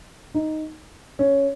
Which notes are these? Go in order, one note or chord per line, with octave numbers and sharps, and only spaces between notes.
D#4
C#4